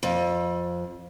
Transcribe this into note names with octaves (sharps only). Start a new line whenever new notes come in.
F2